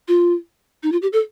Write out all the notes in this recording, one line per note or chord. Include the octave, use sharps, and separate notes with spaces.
F4
D#4
F4
G4
A4